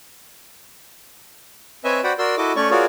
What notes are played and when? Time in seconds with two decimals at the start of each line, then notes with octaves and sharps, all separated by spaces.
1.84 C4 B4 C#5 D#5 E5 G#5
2.04 F#4 C5 D5 F#5 G5 B5
2.18 F#4 A#4 D5 C6 E6
2.37 E4 F#4 A4 D#5 D6
2.56 A3 C#4 C#5 D5 C#6
2.71 F4 F#4 G#4 A#4 C#5 D5